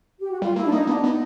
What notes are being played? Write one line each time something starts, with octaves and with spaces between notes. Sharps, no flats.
G4
F#4
G3 F4
A#3 E4
D4
A#3 D#4
B3 D4
B3 D#4